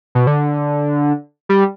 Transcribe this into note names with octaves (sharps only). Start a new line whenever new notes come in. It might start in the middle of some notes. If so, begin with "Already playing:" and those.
B2
D3
G3